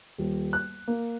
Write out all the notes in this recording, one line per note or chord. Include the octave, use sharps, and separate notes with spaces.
D#1
F#6
A#3